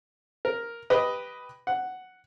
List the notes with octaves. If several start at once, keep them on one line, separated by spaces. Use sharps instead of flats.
A#4
G4 B4 D#5
F#5